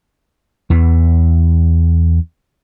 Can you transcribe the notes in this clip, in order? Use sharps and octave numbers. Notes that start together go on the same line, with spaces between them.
E2 E3